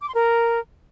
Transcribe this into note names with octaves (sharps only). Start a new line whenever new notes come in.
D6
C6
A#4